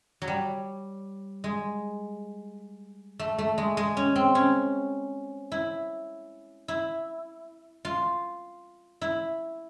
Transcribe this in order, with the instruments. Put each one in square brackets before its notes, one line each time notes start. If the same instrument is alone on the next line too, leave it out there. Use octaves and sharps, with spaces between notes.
[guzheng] F#3
G3
G#3
A3
A3
G#3
G#3
C#4
C4
C#4
E4
E4
F4
E4